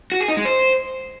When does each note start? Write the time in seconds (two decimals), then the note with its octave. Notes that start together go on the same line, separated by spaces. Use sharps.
0.12 F#4
0.20 G#4
0.28 D#4
0.37 G#3
0.45 C5